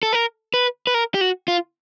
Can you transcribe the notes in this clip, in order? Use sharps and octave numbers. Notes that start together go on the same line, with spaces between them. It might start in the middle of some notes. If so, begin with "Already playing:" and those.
A4
A#4
B4
B4
A#4
G4
F#4
F4